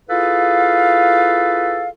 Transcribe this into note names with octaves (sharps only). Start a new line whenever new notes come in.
E4 F4 G#4 A4 B4 F5